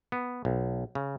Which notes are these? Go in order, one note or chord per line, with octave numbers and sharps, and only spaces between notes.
B3
B1
C#3